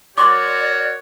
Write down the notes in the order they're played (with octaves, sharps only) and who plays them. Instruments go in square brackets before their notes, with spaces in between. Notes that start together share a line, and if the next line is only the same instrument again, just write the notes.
[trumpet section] F#4 A#4 C#5 [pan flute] D5 [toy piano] C6 D6